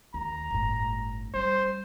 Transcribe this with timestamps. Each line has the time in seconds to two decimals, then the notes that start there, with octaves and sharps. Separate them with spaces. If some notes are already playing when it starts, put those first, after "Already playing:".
0.14 D#2 A#5
0.50 G1 A2
1.34 G3 C#4 C5